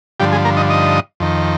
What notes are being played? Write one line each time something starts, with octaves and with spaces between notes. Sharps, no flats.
G2 D3 F3 G3 G4
G#3 G#4
A#3 A#4
D#4 D#5
D#4 D#5
F2 D#3